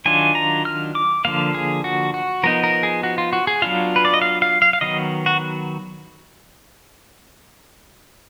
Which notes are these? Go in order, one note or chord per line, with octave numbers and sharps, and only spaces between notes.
D#3 F#3 D4 F4 G#5
A#5
F6
D6
D3 F3 A#3 F5
G#4
F#4
F#4
F3 B3 D#4 A#4
A#4
G#4
F#4
F4
F#4
G#4
F#3 B3 D4 F4 F5
B4
D5
D#5
F5
F5
F5
F5
D#3 F#3 B3 D#5
F#4